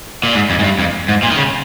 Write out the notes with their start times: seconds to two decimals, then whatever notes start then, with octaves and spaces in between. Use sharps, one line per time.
0.23 A#2
0.34 G#2
0.50 F2
0.59 G#2
0.64 G2
0.79 F2
1.08 G#2
1.23 A#2
1.31 D#3
1.37 C#3